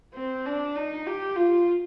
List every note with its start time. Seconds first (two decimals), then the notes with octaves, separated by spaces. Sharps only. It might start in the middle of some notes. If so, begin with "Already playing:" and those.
0.14 C4
0.46 D4
0.76 D#4
1.07 G4
1.36 F4